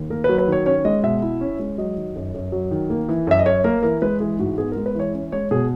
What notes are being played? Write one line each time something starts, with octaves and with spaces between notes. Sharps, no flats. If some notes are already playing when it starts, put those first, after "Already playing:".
Already playing: D#2
A#3 A#4
F#3 B4
B4
D#3 C#5
C#4 C#5
G#3 D#5
B2 E5
E4
C#4
G#3
F#3 D#5
D#3
F#2
F#2
F#3
D#3
A#3
E3
F#2 E5
D#5
F#2 C#5
A#3 A#4
E3 A#4
G#3 B4
E3 G#4
G#2 F#4
B3 G#4
G#3 A#4
B4
E3 C#5
C#4
G#3 C#5
B2 G#4